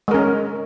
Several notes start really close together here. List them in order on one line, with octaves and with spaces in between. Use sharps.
G#3 A#4 C#4